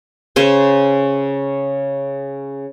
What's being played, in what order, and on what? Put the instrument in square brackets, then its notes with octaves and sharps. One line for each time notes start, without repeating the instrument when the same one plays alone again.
[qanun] C#3 C5 G#5